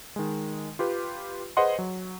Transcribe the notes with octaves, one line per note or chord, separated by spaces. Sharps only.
D#3 G#3
F4 G4 B4
G#4 B4 C5 D#5 F#5 C6
F#3